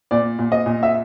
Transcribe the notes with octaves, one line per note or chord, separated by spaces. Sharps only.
A#2 D5
A#2
D#5
A#2
E5